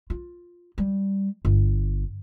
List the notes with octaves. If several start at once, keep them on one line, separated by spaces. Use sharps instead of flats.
F4
G3
G1